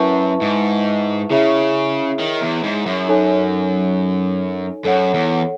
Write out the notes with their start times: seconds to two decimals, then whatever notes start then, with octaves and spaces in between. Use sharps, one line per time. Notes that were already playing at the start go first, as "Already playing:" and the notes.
Already playing: F#2 E4 B4 E5 A5 C#6
0.41 G#2
1.30 C#3 E4 G#4 C#5 E5
2.19 D#3
2.41 E2
2.63 G#2
2.86 F#2
3.08 D#4 A4 C#5 G#5
4.84 F#2 A4 C#5 F#5
5.14 E2